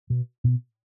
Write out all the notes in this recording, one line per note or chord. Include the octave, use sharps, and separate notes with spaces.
B2
B2